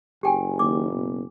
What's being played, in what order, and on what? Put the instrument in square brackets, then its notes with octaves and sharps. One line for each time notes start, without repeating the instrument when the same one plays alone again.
[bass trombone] F#1 [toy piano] G4 G5 G#5
[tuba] D#2 [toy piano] D6
[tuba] B2